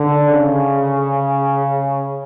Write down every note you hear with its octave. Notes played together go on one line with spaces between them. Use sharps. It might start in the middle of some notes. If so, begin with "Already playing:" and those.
Already playing: D3
C#3